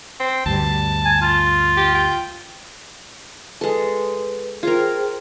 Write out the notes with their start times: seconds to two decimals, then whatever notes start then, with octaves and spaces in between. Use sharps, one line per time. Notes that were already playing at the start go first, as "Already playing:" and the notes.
0.20 C4
0.46 D2 G2 G3 A5
1.05 G#5
1.22 F4
1.77 G4
1.95 G5
3.61 G#3 A4 B4
4.63 F4 G#4 A#4 C5 G5